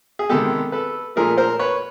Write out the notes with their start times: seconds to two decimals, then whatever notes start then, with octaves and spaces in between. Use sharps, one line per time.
0.19 G#4
0.29 C3 D#3 G#3 B3 G4 A4
0.72 A4 B4
1.16 A#2 F3 A3 G#4 A#4
1.38 A#4 C5
1.59 B4 C#5